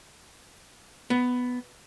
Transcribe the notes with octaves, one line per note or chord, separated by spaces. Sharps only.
B3